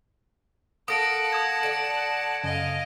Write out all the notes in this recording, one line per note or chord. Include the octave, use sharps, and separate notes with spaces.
A#3 A4 F#5 A5 D#6 A#6 D7
D#6 G#6 D7
D3 D5 D7
F#2 C#3 D#5 F5